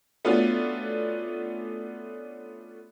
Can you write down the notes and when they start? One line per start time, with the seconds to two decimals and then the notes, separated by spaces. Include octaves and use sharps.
0.25 A3 B3 C#4 D4 F4 F#4